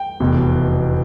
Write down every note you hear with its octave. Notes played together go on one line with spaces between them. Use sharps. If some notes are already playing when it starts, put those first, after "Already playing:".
Already playing: G5
F1 E2 B2